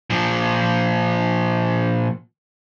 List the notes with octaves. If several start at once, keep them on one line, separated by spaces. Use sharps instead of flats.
A#2 F3